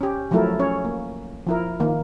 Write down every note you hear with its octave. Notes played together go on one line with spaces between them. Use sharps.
C#4 G4
F3 F#3 A3 E4 A4 A#4
C#4 C#5
A#3
F3 E4 A#4
D#3 A#3